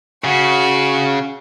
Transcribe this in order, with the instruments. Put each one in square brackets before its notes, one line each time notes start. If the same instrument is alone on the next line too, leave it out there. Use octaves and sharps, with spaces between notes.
[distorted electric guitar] C#3 [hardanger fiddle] F#4